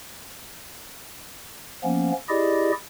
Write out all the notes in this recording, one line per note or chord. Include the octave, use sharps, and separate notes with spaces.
F3 A#3 B3 C#4
E4 G4 G#4 D5 D#5